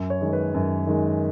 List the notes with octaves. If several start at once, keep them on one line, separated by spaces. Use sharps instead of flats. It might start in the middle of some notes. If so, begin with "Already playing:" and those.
Already playing: F#2
C#5
D#3 G#3
B4
F#2
D#3 G#3